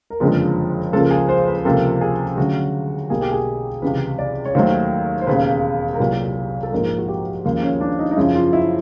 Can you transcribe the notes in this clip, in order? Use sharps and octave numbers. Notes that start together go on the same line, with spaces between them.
A#4
F#1 F2 D3 F3 G#3 B4
C#2 C#3 F3 A#3 A4
G#4
C5
B4
C#2 C3 F3 A#3 A4
G#4
D2 C#3 F#3 F#4
B1 B2 G3 A#3 G#4
G4
G#4
C#2 C3 E3 B4
D5
C#5
D#2 D#3 F#3 A3 C5
C5
E1 D#2 C#3 B4
A#4
C2 A#2 F#3 B4
A4
A#1 G#2 F3 A#3 A#4
F#4
G4
D#2 C#3 F3 A#3
C#4
D4
D#4
D#4
F#2 C#3 F3 E4
F4
E4